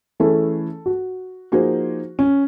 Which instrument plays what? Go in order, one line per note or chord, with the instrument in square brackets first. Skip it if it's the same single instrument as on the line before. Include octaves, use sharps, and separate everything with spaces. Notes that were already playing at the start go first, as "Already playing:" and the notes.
[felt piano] E3 A3 C#4 E4 G#4 [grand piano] A4
[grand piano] F#4
[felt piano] F3 A#3 D#4 G#4 C5 [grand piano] F#4
[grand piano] C#4